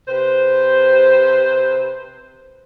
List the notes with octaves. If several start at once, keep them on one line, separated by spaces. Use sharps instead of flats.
C3 B4 C5